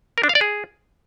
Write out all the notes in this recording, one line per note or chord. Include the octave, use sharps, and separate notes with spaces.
A#4
D4
F5
D5
G#4